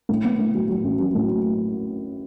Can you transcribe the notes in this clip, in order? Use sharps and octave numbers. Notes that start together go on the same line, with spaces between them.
A2
B3
A2
F#3
F#3
A1
F#3
A2